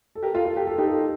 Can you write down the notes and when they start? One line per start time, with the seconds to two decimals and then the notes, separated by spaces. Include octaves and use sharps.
0.15 A4
0.23 G4 A#4
0.34 F4 A4
0.45 F4 A4
0.57 G4
0.67 A4
0.78 D#4 G4
0.87 A4
0.94 G4